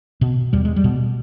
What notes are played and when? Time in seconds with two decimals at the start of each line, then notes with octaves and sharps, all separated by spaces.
0.21 B2
0.53 E2 G3
0.65 G#3
0.76 G3
0.84 B2